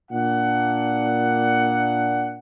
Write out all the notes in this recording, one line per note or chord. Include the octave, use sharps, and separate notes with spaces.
A#2 D4 F#5